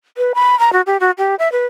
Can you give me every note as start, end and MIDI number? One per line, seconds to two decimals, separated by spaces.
0.18 0.32 71
0.35 0.58 83
0.59 0.73 82
0.73 0.81 66
0.87 0.97 67
1.00 1.11 66
1.18 1.35 67
1.39 1.51 76
1.52 1.66 71